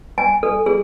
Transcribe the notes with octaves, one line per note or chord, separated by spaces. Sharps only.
G#5
A4
G#4